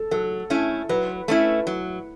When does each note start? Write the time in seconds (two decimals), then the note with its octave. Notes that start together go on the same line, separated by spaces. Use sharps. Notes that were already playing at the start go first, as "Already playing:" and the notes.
Already playing: A4
0.11 F#3 A4
0.50 A3 C#4 E4
0.89 F#3 B4
1.28 A3 C#4 E4
1.67 F#3